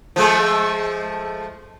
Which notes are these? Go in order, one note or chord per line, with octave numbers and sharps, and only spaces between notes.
F3 G#3 A3